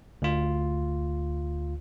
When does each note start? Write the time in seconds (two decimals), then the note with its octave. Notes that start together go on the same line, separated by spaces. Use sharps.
0.22 D2 F4